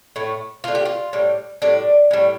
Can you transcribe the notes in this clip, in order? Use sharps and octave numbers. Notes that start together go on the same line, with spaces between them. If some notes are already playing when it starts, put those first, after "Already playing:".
A2 A3
D3 A3 F4
G4
F4
A2 G3
A2 G3 D4
A2 G3